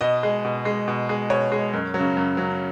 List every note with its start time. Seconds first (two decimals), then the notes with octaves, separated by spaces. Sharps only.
0.01 B2 D#5
0.23 G#3
0.45 B2
0.65 G#3
0.88 B2
1.09 G#3
1.30 B2 C#5
1.52 G#3
1.73 F#2
1.94 C#3 F#3
2.17 F#2
2.37 C#3 F#3